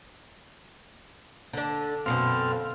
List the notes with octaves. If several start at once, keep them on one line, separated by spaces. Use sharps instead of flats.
D3 D4
F#2 B2 D3 C4 F5